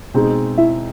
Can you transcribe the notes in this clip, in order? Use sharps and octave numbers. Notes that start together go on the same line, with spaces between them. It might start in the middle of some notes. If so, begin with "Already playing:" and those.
B2 G#3 C4 D#4 G#4
E4 E5